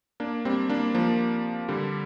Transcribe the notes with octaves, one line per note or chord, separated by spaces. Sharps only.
A#3 D4
G3 C4
A#3 D4
F3 A#3
D3 G3